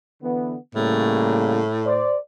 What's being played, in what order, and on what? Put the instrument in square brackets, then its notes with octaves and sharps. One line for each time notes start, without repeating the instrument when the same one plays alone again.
[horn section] D3 E3 B3
[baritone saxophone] A2 [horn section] C#3 G3 A#3
[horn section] C5 D5